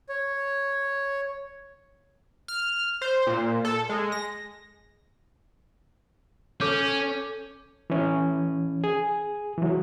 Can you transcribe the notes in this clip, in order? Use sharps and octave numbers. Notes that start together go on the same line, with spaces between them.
C#5
F6
C5
A#2
A4
G#3
A#6
C#4 A4 D6 G6
E3 C#4
G#4
E3 F#3